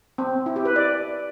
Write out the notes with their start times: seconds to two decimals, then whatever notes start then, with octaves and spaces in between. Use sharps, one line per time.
0.18 C4
0.46 E4
0.56 G4
0.65 B4
0.76 D5